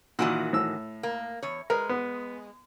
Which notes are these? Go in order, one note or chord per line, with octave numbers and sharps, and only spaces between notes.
A#2 D#3 E3 F#4
A2 E6
A#3
E2 C#5
G#3 A#4 B4
B3